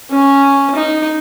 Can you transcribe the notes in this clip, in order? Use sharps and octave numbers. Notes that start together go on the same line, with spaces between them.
C#4
D#4